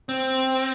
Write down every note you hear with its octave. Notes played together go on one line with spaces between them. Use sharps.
C4